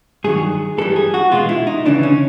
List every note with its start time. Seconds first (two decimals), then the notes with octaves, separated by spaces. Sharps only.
0.24 G2 D#3 F#3 G#4
0.78 G2 E3 G3 A4
0.96 G#4
1.14 F#4
1.31 E2 B2 G#3 F4
1.49 E4
1.67 D#4
1.85 D2 C#3 E3 D4
2.03 C#4